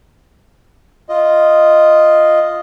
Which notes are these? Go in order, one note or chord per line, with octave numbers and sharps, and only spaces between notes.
F4 D#5